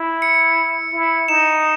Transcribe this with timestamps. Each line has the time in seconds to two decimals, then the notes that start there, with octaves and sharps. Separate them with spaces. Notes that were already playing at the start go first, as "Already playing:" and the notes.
Already playing: E4
0.22 C#7
0.94 E4
1.28 D#4 E7